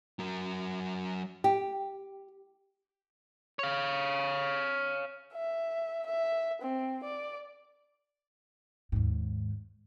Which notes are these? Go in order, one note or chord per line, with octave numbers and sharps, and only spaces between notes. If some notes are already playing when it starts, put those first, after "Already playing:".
F#3 A#4
G4
C#5 F5
E5
E5
C4
D5
D#2 G#2